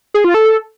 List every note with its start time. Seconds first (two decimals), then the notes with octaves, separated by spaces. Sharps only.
0.14 G#4
0.24 F4
0.34 A4